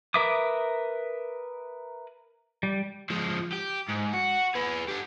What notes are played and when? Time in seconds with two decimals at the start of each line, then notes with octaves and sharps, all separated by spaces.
0.14 A#4 B4 E5 D6 D#6
2.63 G3
3.10 F3 G#3
3.52 G4
3.88 G#2
4.13 F#4
4.55 G#4 B4
4.89 G4 A4